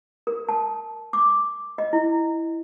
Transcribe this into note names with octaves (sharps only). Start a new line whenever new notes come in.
A#4
A5
D6
D#5
E4